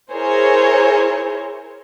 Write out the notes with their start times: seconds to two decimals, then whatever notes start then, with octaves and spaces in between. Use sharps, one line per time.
0.11 E4 G#4 A#4 C5 C#5